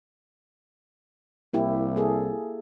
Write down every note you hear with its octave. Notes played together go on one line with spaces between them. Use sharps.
C2 A#3 E4 G4
A#3 G#4 A4